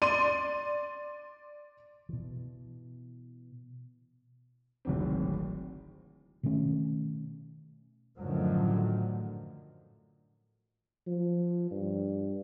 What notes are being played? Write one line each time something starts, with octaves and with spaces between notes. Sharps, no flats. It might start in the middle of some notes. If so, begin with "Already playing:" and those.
D5 C6 D#7
B2 E3
D1 G#1 C4
B2 D#3 A3 C#4
F#2 A2 D3 D#3 F3 F#3
F3
G2